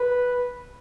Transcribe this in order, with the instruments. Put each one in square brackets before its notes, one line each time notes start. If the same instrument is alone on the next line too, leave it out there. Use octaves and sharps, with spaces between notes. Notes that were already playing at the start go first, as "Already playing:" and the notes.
Already playing: [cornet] B4